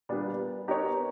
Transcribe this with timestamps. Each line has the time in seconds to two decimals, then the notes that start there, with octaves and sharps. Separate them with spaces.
0.09 A#2 G3 B3 D4
0.68 B3 D#4 G4 A#4 C#5